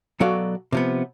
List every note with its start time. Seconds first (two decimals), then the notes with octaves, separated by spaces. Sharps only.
0.20 B2 F#3 F#4 A4 D5 F5
0.72 C3 F3 B3